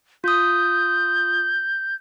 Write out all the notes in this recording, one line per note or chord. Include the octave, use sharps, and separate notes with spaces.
F4 D#6 G6